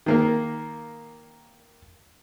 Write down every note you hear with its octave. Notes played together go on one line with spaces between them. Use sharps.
D#3 A#3 A#4